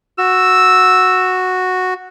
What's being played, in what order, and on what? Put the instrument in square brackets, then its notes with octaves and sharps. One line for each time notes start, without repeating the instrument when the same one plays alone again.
[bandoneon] F#4 [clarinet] E6